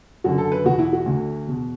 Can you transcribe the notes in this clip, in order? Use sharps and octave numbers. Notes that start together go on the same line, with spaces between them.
F#2 D3 F#4
A4
B4
E2 B2 F#4
E4
F#4
D2 D3
E2 B2